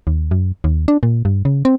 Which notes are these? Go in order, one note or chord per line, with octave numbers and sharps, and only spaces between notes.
D#2
F#2
D#2
D4
A#2
G2
C#3
C4